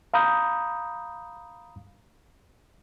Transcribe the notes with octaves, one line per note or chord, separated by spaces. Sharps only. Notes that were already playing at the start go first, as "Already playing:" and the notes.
F5 A#5 B5 D#6 G6